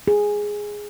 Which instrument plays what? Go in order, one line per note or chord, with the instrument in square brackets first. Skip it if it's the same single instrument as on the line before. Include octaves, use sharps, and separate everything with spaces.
[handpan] G#4